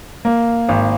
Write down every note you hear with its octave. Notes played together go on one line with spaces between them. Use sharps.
A#3
G#1